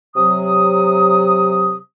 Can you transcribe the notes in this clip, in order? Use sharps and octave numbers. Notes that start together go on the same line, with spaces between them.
C3 F#3 D#6